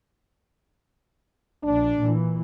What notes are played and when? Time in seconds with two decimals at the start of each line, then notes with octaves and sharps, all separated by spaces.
1.63 A#1 D4
1.98 A#2 E3